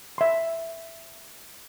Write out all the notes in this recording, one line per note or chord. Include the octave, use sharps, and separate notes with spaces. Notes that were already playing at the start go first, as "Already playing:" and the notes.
E5 C6